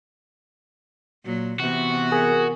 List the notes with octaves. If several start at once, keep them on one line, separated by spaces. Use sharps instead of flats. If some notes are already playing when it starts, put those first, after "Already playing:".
A#2 F#3
C3 E3 B3 F#4
G#4 A#4